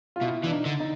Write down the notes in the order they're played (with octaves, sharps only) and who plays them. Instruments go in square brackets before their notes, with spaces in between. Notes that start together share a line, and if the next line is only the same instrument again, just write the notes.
[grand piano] F4
[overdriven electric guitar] B2 [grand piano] E4
[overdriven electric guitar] E3 [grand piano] D4
[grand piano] D#4
[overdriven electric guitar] D3
[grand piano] D#4